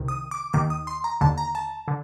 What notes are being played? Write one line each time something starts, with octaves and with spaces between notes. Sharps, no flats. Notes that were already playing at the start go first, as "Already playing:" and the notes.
Already playing: C2 C3 D#3
D#6
D6
D#2 D#3 D6
D#6
C6
A#5
D#2 D3 A5
A#5
A5
D3